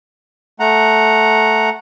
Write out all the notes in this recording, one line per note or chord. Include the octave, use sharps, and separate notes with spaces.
A3 F#5 A#5